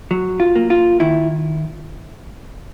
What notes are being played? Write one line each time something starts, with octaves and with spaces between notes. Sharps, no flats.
F#3
F4
A#3
F4
D#3 E4